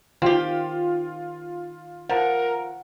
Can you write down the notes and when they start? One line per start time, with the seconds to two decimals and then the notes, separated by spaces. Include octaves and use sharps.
0.22 D#3 C4 F4 G4
2.09 F3 A#4 F#5